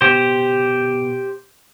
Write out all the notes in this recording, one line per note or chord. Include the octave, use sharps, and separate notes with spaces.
B2 G4 C5